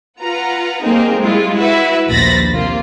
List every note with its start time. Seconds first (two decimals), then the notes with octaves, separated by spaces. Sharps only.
0.21 F4 B4 F#5 A#5
0.83 G3 A#3 C4 D#4 G#4 A#4
1.19 G3 G#3 E4 F4
1.56 E4 F#4 B4 E5
2.10 A#1 D#2 C5 B5 A6 A#6
2.52 C3 A#3 F4